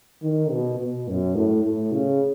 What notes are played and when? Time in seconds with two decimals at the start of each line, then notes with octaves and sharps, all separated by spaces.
0.22 D#3
0.51 B2
0.79 B2
1.08 F#2
1.36 A2
1.64 A2
1.92 C#3